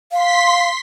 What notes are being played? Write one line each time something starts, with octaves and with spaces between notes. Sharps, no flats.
F5 C6 B6